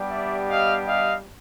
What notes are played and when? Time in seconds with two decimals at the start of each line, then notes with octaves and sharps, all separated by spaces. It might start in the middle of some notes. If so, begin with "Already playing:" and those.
Already playing: G3 B3 D4 G4
0.10 D5 E5
0.49 D#5 F5
0.86 D#5 F5